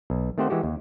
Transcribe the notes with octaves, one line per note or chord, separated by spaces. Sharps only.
B1
D#3 A3 C4 G4 C5 F#5
E3 G#3 F#4 G4
D#2